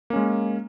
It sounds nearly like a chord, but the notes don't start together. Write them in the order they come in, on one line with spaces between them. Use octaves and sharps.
A#3 C#4 G#3